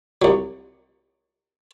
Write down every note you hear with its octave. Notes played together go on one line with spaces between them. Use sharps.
C2 F#3